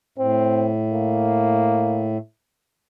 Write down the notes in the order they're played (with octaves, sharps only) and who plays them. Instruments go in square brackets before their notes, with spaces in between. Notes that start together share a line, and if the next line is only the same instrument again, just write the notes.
[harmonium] A2 [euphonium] C4
[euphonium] A#3